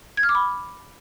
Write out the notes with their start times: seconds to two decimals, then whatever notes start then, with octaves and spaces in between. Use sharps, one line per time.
0.17 G#6
0.23 F6
0.29 D6
0.35 B5